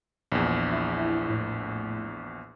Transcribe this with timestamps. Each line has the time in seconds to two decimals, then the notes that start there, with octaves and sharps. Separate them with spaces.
0.32 A#1 E2
0.71 E4
1.28 A2